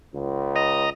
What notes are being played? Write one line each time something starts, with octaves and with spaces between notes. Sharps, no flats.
C#2
D#5 A#5